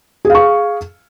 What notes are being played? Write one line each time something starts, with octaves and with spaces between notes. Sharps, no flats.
G#4 F5 C#6